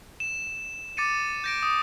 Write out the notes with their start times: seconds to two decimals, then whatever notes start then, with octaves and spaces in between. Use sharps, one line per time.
0.20 E7
0.97 D6 A6 C#7 D#7
1.44 G6 A#6 D7
1.63 D#6